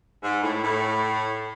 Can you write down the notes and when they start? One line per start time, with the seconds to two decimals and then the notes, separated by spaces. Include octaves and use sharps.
0.22 G#2
0.42 A2
0.62 A2